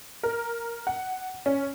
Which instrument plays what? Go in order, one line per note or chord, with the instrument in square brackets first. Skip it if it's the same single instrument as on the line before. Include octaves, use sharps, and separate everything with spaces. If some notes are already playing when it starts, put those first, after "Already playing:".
[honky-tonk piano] A#4
F#5
C#4